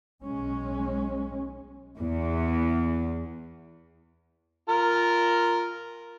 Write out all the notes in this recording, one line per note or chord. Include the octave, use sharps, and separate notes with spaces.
B1 G#3 C#4
E2
F4 A#4